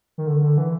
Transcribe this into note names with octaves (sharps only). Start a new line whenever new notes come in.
D#3
D3
D3
E3